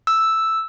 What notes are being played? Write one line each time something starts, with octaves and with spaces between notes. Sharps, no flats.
E6